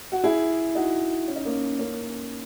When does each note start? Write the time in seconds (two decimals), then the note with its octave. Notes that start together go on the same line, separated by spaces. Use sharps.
0.12 F#4
0.24 E4 G#4
0.75 D#4 F#4
1.28 C#4
1.36 D#4
1.45 A#3 C#4
1.79 A#3 C#4